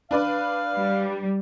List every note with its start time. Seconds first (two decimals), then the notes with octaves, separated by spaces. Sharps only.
0.11 D4 B4 D5 F5
0.75 G3